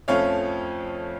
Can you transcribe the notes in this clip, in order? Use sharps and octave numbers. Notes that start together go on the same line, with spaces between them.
F2 F3 A3 C#4 C#5 F5